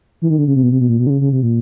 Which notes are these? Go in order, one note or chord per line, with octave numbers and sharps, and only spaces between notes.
E3
D#3
D3
C#3
C3
B2
C3
B2
A#2
B2
D3
C#3
C#3
C3
A#2